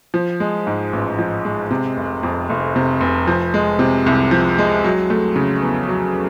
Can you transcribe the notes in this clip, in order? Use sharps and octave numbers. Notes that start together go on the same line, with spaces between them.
F3
G#3
G#2
A1
F3
G#3
C3
F1
F2
F1
C3
F1
F3
G#3
C3
C2
F3
G#3
F#3
A3
C#3
E2
F#3